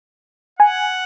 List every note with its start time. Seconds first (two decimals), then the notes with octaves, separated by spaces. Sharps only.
0.59 F#5 G#5